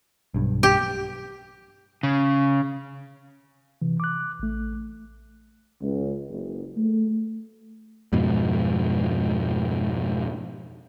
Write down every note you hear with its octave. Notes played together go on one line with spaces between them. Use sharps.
B1 G2
G4
C#3
C3 E3
D6 F#6
A1 A3
C#2
F#1
A3
F2 G#2 B2